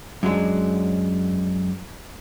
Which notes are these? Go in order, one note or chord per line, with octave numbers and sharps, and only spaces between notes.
F#2 F#3 G#3 D4